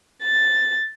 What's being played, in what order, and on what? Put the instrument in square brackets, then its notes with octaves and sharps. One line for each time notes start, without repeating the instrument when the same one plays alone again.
[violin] A6